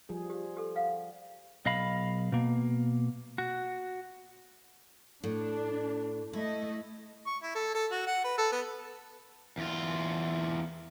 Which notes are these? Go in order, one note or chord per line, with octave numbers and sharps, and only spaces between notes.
F3 G3 G#4
G4
G4 A4
F5 F#5
B1 D#5 F5 B5
B2 A#3
F#4
A2 D4
A3 E4 D#5
C#6
E4
A4
A4
F#4
F#5
B4
A4
B3
E2 F4